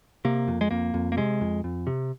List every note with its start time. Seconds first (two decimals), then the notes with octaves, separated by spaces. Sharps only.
0.25 C3 A#3
0.48 F2
0.61 G#3
0.71 F2 A#3
0.94 F2
1.12 A#3
1.17 C3 G#3
1.41 F2
1.64 F2
1.87 C3